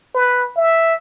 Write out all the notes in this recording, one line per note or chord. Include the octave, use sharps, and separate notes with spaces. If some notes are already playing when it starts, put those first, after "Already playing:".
B4
E5